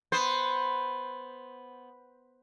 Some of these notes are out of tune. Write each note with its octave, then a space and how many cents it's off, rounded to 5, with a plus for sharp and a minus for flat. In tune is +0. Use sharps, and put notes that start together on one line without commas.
B3 +0 C5 +0